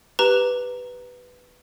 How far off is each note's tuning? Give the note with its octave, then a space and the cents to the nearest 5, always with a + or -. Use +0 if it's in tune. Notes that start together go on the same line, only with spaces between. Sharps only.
G4 +0 B4 +0 A#5 +0